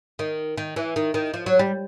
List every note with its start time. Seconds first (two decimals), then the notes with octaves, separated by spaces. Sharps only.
0.19 D#3
0.57 D#3
0.76 E3
0.96 D#3
1.14 D#3
1.34 F3
1.46 F#3
1.59 G3